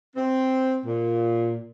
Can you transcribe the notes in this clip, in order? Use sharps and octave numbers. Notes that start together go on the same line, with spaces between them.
C4
A#2